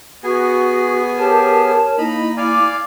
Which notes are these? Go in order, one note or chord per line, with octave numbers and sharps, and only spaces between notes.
B3 F#4 G#4 G#5
G4 A#4 C#5 A5
A#3 D#4 E4 D#5 A#5 B5
D5 F5 G#5 D6